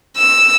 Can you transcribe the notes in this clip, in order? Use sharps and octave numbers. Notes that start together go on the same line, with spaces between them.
E6